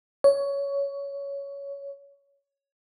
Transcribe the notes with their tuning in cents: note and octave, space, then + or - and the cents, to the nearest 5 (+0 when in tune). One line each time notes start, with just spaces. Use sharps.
C#5 +15